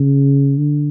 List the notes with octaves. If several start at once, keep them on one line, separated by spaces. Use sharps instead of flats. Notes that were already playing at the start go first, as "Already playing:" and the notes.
Already playing: C#3
D3